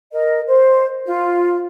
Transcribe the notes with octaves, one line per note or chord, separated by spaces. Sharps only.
A#4 D#5
C5
F4